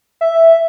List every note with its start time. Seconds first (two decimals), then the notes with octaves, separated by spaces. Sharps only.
0.21 E5